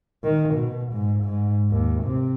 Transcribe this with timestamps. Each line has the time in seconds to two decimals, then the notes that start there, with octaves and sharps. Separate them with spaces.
0.24 D#3
0.55 B2
0.93 G#2
1.24 G#2
1.71 D#2
2.04 C3